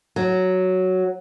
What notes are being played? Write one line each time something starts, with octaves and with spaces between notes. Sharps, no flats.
F#3